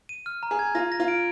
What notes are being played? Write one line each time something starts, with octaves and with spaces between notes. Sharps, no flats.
D#7
F6
A#5
G#4
G#6
F4 A#6
A#6
F4
D7